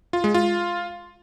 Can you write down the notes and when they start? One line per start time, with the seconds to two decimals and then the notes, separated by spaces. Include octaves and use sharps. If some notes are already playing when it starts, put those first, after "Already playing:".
0.13 F4
0.24 G#3
0.34 F4